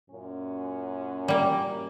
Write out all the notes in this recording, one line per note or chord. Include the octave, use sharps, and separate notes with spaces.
F#2 A#2 C#4
G3 A#3